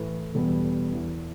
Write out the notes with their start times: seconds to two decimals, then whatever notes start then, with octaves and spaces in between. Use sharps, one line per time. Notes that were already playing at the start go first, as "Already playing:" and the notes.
Already playing: A2 E3 A3 B4
0.34 E2 B2 G3 B3 A4
0.92 E2 E3 B3